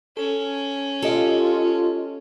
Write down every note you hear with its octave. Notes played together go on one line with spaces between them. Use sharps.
C#4 A4
F4 G4 A4 D#5 F5